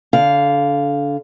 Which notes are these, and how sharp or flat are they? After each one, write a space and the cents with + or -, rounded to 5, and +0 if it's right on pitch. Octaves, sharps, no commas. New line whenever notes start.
D3 -25 F5 +0